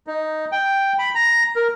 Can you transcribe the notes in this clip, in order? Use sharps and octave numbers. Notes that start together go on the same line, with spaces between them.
D#4
G5
B5
A#5
A#4